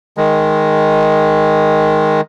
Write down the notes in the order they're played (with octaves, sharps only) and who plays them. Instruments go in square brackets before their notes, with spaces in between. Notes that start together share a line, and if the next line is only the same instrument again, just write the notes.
[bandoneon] D#3 G#3